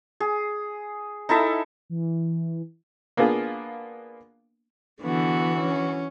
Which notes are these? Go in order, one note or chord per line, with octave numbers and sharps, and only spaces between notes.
G#4
D#4 E4 A4 E5
E3
A#3 B3 D4 F4 G#4
D3 E3 B3 F#4
C#4